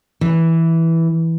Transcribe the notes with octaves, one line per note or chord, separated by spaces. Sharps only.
E3